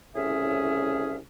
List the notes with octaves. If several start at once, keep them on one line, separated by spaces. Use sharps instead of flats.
C2 A2 C#3 C#4 G#4 E5